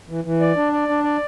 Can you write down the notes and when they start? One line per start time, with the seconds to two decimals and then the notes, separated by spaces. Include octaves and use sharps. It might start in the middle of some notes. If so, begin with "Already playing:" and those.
0.09 E3
0.24 E3
0.41 D5
0.56 D4
0.73 D5
0.89 D4
1.04 D5